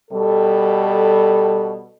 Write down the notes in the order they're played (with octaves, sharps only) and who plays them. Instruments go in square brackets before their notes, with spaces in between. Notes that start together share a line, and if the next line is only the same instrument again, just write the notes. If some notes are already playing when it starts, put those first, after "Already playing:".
[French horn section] B2 G3 A4